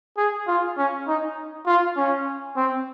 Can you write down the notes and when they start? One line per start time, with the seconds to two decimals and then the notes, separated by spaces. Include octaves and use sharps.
0.17 G#4
0.47 F4
0.78 C#4
1.08 D#4
1.66 F4
1.97 C#4
2.57 C4